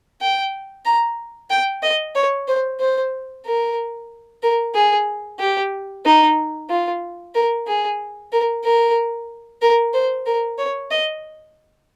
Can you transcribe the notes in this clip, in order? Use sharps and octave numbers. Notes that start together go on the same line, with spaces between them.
G5
A#5
G5
D#5
C#5
C5
C5
A#4
A#4
G#4
G4
D#4
F4
A#4
G#4
A#4
A#4
A#4
C5
A#4
C#5
D#5